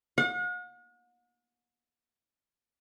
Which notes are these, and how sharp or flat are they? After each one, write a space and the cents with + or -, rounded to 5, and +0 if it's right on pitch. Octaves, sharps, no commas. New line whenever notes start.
F#5 -45